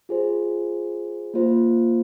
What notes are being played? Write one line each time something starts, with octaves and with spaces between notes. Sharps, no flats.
F4 G#4 C5
A#3 F4 C5